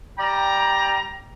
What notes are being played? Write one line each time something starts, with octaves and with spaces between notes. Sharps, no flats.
G3 D5 G5 A#5